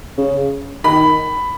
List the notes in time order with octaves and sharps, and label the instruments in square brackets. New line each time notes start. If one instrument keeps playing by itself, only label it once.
[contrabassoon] C#3
[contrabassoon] D#3 [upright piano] B5